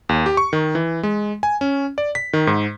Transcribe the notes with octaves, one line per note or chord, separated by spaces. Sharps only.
D#2
G4
C#6
D#3
E3
G#3
G#5
C#4
D5
B6
D#3
G#2